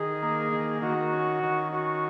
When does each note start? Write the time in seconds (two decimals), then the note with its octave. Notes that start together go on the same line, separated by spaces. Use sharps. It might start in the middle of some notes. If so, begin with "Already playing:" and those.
Already playing: D#3 G#4
0.23 A#3
0.52 D#3
0.82 D#3 F#4
1.12 C#4
1.43 D#3
1.72 C#4 F#4